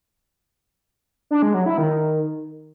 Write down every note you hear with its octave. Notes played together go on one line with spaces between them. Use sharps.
D4
G#3
F#3
E4
D#3